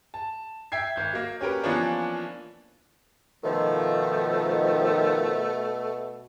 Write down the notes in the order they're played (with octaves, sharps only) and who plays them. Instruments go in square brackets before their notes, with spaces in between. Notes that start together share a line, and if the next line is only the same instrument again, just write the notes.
[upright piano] A5
E5 G5 G#6 C7
G#1 G6
F#3 A#3
C#4 G4 A#4 B4
E3 F3 A#3 B3 C#4 D4
[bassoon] B2 [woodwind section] D#3 F3 [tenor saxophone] A3